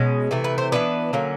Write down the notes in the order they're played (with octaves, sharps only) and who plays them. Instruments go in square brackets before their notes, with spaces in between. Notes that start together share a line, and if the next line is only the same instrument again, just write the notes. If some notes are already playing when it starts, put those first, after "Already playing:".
Already playing: [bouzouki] B2 G#3 C#4
C3 E3 A3
B4
C5
E3 G3 B3 D4 B4
D3 F#3 A#3 C#4